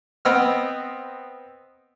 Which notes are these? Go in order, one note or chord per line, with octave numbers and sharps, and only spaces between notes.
B3 C4 D#5 E6 F6